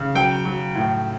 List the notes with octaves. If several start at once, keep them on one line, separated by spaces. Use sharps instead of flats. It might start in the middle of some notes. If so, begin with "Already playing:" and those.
Already playing: C#3
F#3 G5
F#3
A2